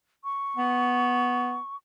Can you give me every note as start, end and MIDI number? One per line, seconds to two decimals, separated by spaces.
0.24 1.76 85
0.56 1.57 59